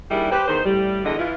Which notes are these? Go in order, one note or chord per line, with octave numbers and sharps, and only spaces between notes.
D#2 G3 D4 E4 G#4 A#4
G4 B4 C5
E2 D#3 D#4 G#4 C5
A2 G3
E2 D3 D#5
E3 E4 F4